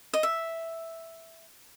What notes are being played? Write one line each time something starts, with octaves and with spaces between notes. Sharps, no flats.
D#5
E5